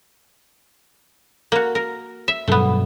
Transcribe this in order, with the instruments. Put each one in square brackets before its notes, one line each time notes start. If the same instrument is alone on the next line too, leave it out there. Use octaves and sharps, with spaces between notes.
[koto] A#3 F#4
A#4
E5
[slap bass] G2 B2 F#3 [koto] A3 B3